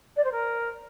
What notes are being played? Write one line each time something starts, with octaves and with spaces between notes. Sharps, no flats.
D5
C5
A#4